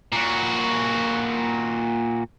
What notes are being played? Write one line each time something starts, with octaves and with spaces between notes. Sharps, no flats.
A#2 F#4